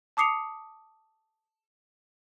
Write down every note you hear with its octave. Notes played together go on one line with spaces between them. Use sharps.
A5 D6 D#6 C7 C#7 F7